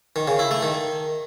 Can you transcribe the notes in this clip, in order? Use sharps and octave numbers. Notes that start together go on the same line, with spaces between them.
D#3
C#3
E4
A3
D#3